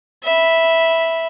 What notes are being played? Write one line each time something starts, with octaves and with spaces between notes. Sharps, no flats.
E5 B5